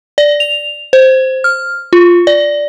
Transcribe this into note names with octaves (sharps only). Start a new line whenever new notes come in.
D5
F7
C5
F6
F4
D5